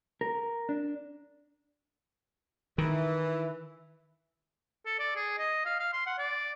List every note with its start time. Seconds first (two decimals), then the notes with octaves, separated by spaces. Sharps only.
0.21 A#4
0.69 D4
2.78 D#3 E3
4.86 A4
4.99 D5
5.16 G#4
5.38 D#5
5.66 F5
5.79 F5
5.93 C6
6.06 F#5
6.18 D5